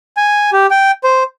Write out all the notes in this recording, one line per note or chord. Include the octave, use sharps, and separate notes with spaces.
G#5
G4
G5
C5